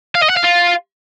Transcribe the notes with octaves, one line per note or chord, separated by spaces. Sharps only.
F5
D#5
F#5
F5
F4